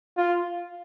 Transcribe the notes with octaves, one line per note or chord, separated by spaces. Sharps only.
F4